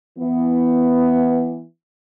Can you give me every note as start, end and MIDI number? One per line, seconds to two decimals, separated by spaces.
0.18 1.63 52
0.18 1.63 59